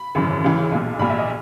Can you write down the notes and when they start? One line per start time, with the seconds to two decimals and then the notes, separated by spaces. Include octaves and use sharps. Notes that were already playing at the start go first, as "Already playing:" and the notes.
Already playing: B5
0.15 G#1 F#2 C#3 E3
0.44 C#2 C#3 E3
0.72 B1 A#2
0.99 A#1 B5
1.02 A#2
1.10 E5
1.19 D#5